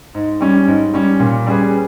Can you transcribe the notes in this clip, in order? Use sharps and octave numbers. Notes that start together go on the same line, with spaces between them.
G#2
G3 C#4
G#2
G3 C#4
A#2
G3 C#4 G#4 B4